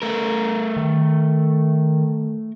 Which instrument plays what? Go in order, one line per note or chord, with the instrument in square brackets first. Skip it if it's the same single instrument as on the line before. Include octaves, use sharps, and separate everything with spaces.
[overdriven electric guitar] A3 A#4
[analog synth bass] D#3